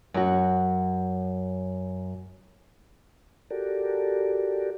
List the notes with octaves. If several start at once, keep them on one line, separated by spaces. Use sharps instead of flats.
F#2 F#4
F#4 G4 A4 A#4 D5